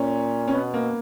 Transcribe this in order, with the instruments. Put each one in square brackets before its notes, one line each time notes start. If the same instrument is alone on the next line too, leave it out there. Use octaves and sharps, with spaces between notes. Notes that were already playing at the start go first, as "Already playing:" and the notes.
Already playing: [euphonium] A#2 [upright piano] C#4
[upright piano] C#4
[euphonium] B2 [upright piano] B3
[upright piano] A#3